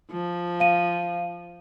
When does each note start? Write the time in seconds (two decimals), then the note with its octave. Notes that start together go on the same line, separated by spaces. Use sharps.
0.11 F3
0.60 F5 D#7